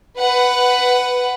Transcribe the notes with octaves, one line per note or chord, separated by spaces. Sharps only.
B4 F#5